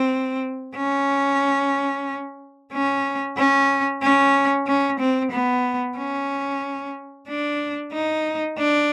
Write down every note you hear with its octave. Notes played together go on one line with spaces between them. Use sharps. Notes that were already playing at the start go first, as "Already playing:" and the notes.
Already playing: C4
C#4
C#4
C#4
C#4
C#4
C4
B3
C#4
D4
D#4
D4